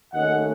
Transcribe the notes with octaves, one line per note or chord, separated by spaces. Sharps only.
D#2 D#3 A3 C#4 D#5 F#5